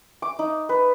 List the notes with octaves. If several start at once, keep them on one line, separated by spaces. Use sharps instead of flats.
D6
D#4
B4